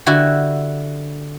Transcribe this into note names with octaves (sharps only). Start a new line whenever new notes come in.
D3 E4 F#4 G4